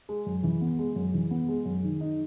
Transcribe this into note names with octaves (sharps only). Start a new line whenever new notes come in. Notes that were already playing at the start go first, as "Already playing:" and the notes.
G#3
F#2
E3
B3
G#3
F#2
E3
B3
G#3
F#2
D#3
D#4